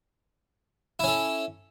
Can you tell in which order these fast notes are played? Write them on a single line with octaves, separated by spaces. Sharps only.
E4 C#4 A4